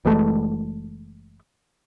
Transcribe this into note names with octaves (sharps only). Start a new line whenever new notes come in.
F#1 E3 G#3 A3